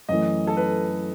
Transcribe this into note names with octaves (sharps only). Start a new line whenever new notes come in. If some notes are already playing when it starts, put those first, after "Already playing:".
F#2 E3 A3 D#5
A4
B4